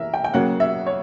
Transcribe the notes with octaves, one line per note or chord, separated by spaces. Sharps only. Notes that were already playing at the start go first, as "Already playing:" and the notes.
Already playing: E3 A#4 E5
G5
G5
C#3 F#3 A#3 F#5
E5
C#5